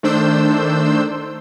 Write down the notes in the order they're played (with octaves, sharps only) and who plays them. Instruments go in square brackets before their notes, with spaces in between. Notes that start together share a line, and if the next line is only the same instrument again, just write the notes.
[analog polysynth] D#3 A3 D4 C5 E6 G6